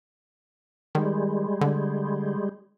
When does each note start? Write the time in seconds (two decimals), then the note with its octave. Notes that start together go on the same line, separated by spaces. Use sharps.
0.95 D#3 G3 G#3
1.61 D3